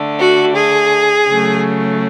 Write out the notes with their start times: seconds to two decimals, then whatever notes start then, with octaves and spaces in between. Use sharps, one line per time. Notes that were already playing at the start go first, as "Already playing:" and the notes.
Already playing: D3 A3
0.19 F#4
0.55 G#4
1.27 C#3 F#3 A3